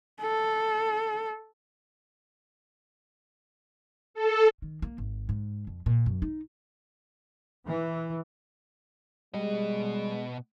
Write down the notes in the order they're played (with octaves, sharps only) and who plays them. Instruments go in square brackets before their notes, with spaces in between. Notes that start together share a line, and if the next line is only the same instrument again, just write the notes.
[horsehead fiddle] A4
[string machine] A4
[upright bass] D#3
A#3
G#1
G#2
F2
A#2
F#2
D#4
[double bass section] E3
[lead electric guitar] B2 D#5 [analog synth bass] G3 [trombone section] G#3